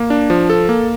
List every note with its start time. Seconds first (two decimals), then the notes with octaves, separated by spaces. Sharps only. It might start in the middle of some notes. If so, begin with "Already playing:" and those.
Already playing: A#3
0.10 D4
0.30 F3
0.50 A4
0.69 A#3